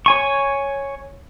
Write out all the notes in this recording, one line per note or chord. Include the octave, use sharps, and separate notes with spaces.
C#5 G#5 C#6